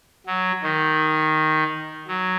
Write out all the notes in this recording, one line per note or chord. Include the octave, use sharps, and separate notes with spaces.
F#3
D#3
F#3